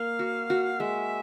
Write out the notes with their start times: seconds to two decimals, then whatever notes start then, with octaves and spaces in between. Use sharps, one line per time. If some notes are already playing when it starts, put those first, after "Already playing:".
Already playing: A#3 F5
0.19 F#4
0.50 F#4
0.80 G#3 E5